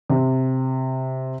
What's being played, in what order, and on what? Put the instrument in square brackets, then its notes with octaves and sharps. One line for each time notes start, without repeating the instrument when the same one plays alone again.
[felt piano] C3